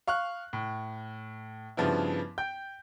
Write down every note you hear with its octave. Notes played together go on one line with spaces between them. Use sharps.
F5 C#6 F6 F#6
A2
G2 C#3 F3 B3 E4
G5 G6